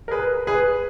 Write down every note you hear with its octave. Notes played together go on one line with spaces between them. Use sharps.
A#4
G#4 B4
G#4 B4